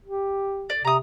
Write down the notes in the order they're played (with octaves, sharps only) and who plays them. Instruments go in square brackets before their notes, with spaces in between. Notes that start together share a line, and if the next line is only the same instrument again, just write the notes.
[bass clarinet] G4
[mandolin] D5
[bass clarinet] C3 [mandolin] A#5 D#6